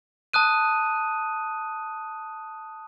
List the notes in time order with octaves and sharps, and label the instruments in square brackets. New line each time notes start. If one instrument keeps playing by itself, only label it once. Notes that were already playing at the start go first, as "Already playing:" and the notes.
[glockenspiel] A5 D#6 F#6 D#7